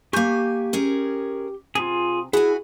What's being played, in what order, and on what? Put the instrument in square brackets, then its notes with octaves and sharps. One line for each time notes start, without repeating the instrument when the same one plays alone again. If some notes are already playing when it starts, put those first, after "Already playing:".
[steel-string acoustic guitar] A#3 G#5 [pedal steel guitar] G4 C#6 G6
[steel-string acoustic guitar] C#4 G#4 A#4
[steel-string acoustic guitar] C3 [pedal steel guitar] F4 G#4
[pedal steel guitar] E4 [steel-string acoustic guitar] F#4 G#5 [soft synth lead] G#4